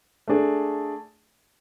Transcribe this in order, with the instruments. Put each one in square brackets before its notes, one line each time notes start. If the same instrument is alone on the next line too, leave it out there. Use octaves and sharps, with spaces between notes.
[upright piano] A3 D4 G#4